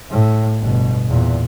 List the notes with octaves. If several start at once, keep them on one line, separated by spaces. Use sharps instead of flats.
A2
G1 B2
E2 A#2